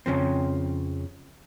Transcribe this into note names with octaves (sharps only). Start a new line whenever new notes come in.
F2 C#3 F3 C4